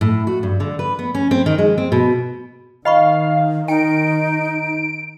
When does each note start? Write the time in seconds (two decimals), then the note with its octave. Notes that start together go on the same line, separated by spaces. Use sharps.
0.01 A2
0.27 F#4
0.43 G2
0.60 D3
0.79 B4
0.99 B3
1.15 C#4
1.31 C4
1.46 D#3
1.58 G#3
1.78 C4
1.92 B2
2.85 D#3 D#5 F5 B5 C#6
3.68 D#4 G5 D7